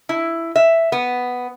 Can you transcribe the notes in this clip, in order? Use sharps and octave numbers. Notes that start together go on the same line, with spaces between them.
E4
E5
B3